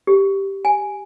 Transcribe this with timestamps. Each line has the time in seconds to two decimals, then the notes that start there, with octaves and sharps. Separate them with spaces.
0.07 G4
0.65 G#5